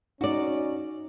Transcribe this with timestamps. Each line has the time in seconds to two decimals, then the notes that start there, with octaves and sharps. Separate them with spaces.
0.21 C#4 D#4 F#4 D5